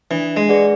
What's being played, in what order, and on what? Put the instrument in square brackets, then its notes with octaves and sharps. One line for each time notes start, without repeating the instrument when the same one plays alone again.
[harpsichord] E3 [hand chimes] D4
[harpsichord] G#3
[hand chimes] G#4 B4 D5 F#5